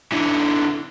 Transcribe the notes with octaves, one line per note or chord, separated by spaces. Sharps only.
D3 E3